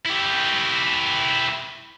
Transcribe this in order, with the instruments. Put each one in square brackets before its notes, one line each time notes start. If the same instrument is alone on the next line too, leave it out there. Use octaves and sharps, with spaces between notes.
[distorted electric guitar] E4 G4